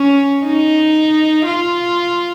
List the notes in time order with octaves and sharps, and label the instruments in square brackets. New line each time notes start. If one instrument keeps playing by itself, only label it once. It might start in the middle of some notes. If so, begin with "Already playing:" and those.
Already playing: [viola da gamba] C#4
D#4
F4